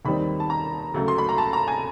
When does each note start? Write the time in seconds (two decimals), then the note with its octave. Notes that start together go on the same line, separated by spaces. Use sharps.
0.05 D#2 D#3 G3 C4 D#4 B5
0.40 A5
0.50 A#5
0.94 D2 C#3 F#3 A3
1.08 C6
1.18 B5
1.29 A#5
1.38 A5
1.53 A#5
1.68 G#5